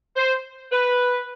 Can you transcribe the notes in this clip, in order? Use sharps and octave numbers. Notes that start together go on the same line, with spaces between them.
C5
B4